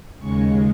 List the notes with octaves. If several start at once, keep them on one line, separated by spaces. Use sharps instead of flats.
D#2 C#3 G#3 C#6